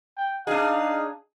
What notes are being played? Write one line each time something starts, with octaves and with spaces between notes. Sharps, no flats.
G5
D4 D#4 G#4 F5